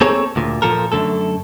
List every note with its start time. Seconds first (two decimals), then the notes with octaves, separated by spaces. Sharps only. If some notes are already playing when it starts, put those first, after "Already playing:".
0.01 A#3 C4 G#4 A4 C#5
0.36 D2 A#2
0.62 A#2 F3 A4 A#4
0.92 F#2 D3 A3 A4